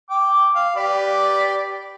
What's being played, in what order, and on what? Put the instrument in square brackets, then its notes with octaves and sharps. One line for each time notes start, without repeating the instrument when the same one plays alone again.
[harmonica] G5 D6
F5
G4 B4 D5